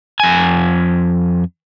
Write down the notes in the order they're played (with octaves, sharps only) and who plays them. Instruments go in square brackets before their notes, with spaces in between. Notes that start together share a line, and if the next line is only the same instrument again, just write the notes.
[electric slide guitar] F2 G#5